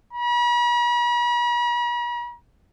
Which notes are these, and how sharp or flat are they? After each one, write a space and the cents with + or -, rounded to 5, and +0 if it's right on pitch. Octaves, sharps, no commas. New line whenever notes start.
B5 -45